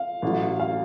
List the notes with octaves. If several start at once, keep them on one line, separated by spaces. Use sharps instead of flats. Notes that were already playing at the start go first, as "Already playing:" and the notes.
Already playing: F5
A1 A2 F#3
F5